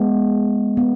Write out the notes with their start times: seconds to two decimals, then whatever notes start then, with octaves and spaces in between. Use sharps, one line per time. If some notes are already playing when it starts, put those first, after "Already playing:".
Already playing: G#3 B3
0.77 B3